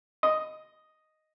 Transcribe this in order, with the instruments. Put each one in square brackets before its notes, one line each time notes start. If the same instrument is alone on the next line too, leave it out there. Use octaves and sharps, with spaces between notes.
[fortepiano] D#5